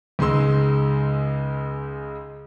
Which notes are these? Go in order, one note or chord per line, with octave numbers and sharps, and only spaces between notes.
C#2 G#3 D#4 C6 E6